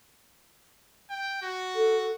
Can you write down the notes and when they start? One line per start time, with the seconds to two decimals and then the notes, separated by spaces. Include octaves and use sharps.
1.10 G5
1.42 F#4
1.75 A4